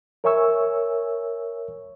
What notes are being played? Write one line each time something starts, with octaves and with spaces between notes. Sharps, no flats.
A#4 C#5 E5 G#5 C#6 E6